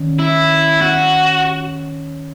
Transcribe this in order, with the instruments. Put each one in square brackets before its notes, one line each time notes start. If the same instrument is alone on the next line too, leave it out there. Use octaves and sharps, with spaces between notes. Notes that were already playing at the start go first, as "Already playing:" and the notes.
Already playing: [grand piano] D#3 C#4
[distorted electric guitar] E4
F#4